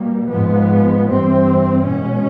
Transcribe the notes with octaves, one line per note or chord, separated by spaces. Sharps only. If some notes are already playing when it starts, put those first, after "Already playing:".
Already playing: B2 G3 A#3
G#2 F3 G#3 B3
G2 E3 G3 C4
B2 G#3 C#4